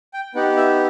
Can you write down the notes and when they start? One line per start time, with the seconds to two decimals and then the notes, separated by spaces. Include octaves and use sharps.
0.14 G5
0.35 B3 D#4 G4 F#5
0.57 E5